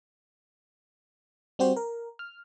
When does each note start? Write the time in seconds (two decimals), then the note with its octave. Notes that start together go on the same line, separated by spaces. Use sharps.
1.59 G3 C4 F#4 G4 C5
1.76 A#4
2.19 F6